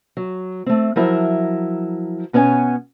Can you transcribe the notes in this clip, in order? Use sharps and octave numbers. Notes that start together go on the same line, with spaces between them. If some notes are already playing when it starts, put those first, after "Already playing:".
F#3
A3 C4
F3 F#3 E4 A#4 E5
B2 B3 C#4 C5 C#5 G#5